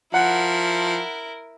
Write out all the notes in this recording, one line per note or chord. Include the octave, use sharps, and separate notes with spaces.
F3 E4 A#4 F#5